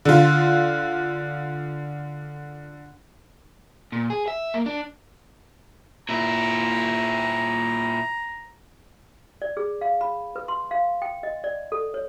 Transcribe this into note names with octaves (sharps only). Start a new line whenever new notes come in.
D3 F4
A#2
G#4
E5
A#3
D4
A#2 E4 A#5
D5
G#4
F5
B5
B4
C6
F5
G5
D#5
D5
A4
C#5